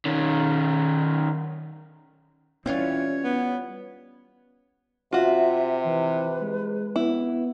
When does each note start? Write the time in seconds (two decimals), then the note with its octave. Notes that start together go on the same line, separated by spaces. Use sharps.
0.05 D#3 C#4
2.66 E3 G3 C4 C#4 F4 C#5
3.24 B3
5.13 C3 F4 F#4 E5
5.84 E3 B4
6.41 G#3
6.96 B3 E4